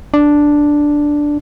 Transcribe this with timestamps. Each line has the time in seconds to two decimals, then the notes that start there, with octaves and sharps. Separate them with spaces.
0.14 D4